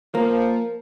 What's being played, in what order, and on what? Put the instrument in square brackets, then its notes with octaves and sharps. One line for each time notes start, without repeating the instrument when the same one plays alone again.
[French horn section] F3 [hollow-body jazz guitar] A#3 [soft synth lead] A#4